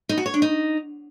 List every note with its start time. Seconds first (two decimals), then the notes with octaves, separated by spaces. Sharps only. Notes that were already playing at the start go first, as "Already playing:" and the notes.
0.09 D#4
0.18 F#4
0.26 C#5
0.34 D4
0.42 D#4